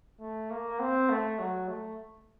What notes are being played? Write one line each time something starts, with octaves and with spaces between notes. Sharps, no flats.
A3
A#3
C4
A3
F#3
A3